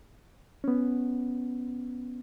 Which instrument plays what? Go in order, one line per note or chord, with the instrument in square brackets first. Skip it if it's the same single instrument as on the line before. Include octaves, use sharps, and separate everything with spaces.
[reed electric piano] B3 C#4